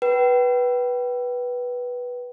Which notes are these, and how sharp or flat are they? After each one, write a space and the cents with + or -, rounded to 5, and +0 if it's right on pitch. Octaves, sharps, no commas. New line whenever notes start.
B4 -10 G5 -30